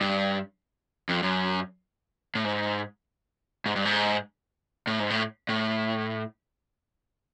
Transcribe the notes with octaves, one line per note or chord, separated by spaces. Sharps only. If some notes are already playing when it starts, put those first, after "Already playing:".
G2
F2
F#2
A2
G#2
G#2
G2
G#2
A2
G#2
A2
A2